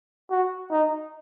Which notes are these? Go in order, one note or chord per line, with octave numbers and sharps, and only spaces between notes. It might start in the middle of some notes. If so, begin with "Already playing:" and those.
F#4
D#4